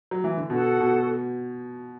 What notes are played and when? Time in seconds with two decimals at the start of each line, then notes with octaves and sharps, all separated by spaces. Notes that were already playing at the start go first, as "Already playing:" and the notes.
0.11 F#3
0.24 E3
0.37 D3
0.50 B2 F#4 A4 F#5 A5
0.80 B2